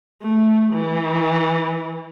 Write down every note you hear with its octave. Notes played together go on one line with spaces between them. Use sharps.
A3
E3